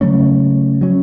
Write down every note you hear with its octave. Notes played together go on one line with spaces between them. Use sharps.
C#3 F#3 A3 C#4
F#3 C#4